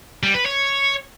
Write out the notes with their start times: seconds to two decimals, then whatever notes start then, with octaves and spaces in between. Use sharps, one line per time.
0.23 G3
0.34 B4
0.46 C#5